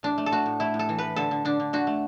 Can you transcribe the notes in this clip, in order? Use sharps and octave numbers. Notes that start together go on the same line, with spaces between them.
A2 D4
A3
A4
A3 F#4
A2
A3 E4
A2
A4
E3
A2 B4
D3 A4
D3
D3 D4
D3
D3 F#4
A3